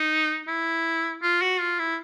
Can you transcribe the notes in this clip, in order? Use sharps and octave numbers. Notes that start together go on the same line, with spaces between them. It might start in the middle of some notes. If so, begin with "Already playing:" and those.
Already playing: D#4
E4
F4
F#4
F4
E4